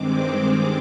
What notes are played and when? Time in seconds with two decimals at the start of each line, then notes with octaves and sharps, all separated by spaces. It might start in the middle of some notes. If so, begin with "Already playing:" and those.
Already playing: G2 D#3 G#3 C4 D6
0.29 D6